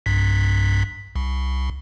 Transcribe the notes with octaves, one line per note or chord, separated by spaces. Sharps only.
B1 G2 B6
C2